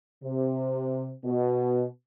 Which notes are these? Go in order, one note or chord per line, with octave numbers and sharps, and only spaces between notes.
C3
B2